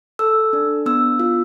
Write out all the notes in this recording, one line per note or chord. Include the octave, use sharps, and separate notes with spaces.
A4 E6
D4
B3 E6
F4